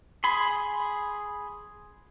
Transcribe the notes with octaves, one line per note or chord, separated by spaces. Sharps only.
G#4 B5 C6